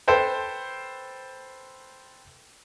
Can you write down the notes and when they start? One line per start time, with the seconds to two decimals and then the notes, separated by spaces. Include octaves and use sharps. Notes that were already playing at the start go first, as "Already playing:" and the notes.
0.08 A4 B4 C5 G5